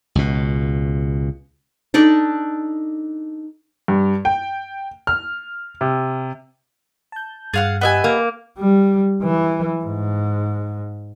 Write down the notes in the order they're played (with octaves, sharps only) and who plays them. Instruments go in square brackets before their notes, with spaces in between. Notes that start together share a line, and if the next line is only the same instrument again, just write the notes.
[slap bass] C#2 B2
[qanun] D4 D#4 A4 D5
[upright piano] G2
G5
F6
C3
[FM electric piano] A5 G6
[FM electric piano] G2 [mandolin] G#4 F5 F#5 [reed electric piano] A6
[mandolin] B3 E5 G#5 [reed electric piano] G4 D#5 F#5
[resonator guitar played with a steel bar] A#3
[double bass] G3
E3
G#2